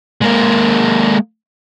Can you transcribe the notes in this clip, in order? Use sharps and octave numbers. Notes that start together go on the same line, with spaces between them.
G#3 A#3